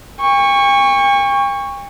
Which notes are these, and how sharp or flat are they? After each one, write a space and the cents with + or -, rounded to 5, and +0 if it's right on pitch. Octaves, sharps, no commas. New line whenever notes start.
G5 +45 C#6 +0